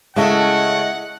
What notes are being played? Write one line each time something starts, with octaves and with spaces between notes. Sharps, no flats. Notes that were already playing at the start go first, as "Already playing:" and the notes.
C#3 G#3 A3 E4 D#5 E5 F#5